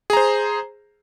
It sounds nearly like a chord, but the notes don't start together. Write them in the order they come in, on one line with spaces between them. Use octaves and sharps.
G#4 A#5 C5